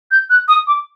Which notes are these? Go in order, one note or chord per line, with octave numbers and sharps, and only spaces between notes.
G6
F#6
D#6
D6